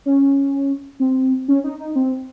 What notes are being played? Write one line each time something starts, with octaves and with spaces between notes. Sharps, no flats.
C#4
C4
C#4
D#4
D#4
C4